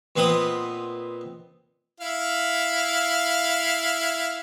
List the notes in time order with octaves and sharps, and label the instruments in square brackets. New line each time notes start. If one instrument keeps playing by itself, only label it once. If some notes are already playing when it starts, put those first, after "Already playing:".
[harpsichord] A#2 B3 C4 B4 D#5 D#6
[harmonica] E4 F5